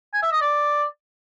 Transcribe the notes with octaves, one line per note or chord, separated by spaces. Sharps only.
G#5
E5
D#5
D5